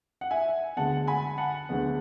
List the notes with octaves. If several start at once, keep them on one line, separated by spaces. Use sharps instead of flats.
F#5
E5 G#5
D2 D3 G#3 B3 F#5 A5
G#5 B5
F#5 A5
D2 D3 G#3 B3